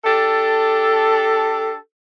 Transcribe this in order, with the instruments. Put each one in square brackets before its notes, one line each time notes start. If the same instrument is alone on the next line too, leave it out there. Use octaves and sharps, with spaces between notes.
[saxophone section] D4 G4 A4